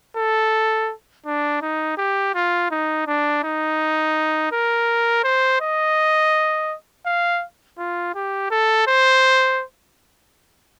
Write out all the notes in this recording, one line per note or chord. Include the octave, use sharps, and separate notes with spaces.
A4
D4
D#4
G4
F4
D#4
D4
D#4
A#4
C5
D#5
F5
F4
G4
A4
C5